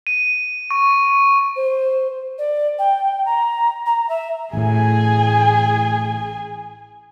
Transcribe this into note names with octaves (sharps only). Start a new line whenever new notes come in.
D#7
C#6
C5
D5
G5
A#5
A#5
E5
A1 A2 G#4 G#5